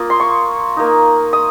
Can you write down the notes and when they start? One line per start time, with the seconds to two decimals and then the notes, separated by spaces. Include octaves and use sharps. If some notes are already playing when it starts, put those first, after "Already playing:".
Already playing: A#3 F4 D#6
0.10 C6
0.20 C#6
0.77 A#3 D#4
1.33 D#6